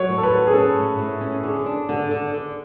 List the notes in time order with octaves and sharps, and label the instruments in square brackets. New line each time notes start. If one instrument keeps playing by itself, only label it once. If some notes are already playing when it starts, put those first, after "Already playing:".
Already playing: [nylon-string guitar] F#3 [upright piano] C#5
[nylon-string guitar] A2
[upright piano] A4
B4
[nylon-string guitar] F#3
[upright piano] G#4
[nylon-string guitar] C#4 [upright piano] A4
[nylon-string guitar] A2
A2
C#4
[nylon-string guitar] D3 [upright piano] G#4
[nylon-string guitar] D4
D3
D3
D3